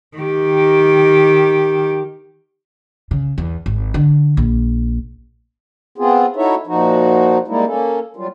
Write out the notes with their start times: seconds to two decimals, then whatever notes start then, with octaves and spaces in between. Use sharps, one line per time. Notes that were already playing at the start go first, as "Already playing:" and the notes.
0.18 D#3 G4
3.11 C#3
3.38 E2
3.66 G#1
3.94 D3
4.37 A#1
5.98 B3 C4 F4 G#4
6.36 D#4 E4 F#4 A4 C#5 E5
6.67 A#2 F3 D#4 F#4
7.48 G3 G#3 A#3 D#4 E4
7.67 A#3 C#4 A4
8.16 F#3 G3 F4